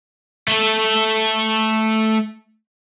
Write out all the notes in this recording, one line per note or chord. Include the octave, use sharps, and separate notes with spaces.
A3 A4